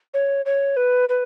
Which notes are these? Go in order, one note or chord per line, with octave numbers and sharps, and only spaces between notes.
C#5
C#5
B4
B4